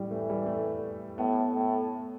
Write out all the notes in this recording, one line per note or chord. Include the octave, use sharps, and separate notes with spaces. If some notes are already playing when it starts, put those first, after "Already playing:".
Already playing: A2 G3
E3 A3
G3
A3
A2 B3
A2